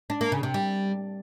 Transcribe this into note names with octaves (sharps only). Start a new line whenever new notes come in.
D4
A#3
C#3
C3
G3